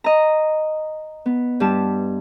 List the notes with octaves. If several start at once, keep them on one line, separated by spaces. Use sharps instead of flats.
D#5 A#5
B3
G2 G3 A5